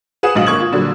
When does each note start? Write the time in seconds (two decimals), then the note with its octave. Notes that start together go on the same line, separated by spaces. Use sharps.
0.23 G#4 B4 F#5 D#6 E7
0.35 A#1 G#2 F#3 D#5 F5 F#7
0.46 G1 A#3 C#6 G#6 F#7
0.60 F4
0.72 A#2 D3 F#3 G3